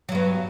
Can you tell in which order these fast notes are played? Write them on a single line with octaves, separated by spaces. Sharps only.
F#3 G2 B3